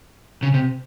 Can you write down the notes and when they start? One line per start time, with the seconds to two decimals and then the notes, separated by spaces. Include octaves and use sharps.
0.43 C#3
0.54 C3